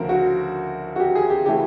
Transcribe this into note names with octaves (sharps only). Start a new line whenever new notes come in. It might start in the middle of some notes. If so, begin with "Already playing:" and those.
Already playing: D2 C#3 F3 A#4
F#4
F#4
G4
G#4
G4
C#3 E3 A3 G4